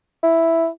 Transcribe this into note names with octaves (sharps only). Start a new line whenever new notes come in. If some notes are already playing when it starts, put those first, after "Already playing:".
E4